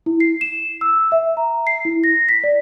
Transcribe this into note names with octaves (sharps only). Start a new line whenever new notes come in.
E4
C7
E7
E6
E5
A#5
C7
E4
A#6
B6
D5